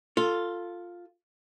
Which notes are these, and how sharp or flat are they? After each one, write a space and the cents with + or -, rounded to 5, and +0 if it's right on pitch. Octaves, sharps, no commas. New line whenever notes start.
F4 +5 A4 +20